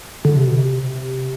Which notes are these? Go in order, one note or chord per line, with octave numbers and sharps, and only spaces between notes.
D3
C3
B2
C3